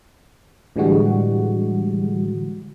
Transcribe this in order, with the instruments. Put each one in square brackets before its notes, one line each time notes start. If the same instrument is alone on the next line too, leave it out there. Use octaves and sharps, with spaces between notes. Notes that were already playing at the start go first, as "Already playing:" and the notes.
[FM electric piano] A2 D3 E3 G3 G#3 F#4